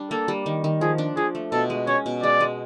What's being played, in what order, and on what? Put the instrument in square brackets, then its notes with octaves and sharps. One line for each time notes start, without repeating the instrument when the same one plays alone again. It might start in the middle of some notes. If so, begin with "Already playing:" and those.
Already playing: [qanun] G3 D4
[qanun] A#3 [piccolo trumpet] A4
[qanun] G3
D#3
D#3
[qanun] F3 [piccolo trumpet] G#4
[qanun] D4
[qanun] F3 [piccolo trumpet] G#4
[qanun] A3
[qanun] B2 [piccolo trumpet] A4
[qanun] G#3
[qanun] C#4 [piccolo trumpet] C#5
[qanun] B2
[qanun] G#3 [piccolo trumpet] D5
[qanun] G#3